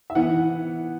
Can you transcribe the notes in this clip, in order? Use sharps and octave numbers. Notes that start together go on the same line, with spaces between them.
E5
E3 B3 F#5